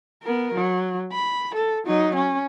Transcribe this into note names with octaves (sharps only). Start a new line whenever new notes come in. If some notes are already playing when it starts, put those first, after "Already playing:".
B3 A#4
F#3
B5
A4
F#3 D#4
C#4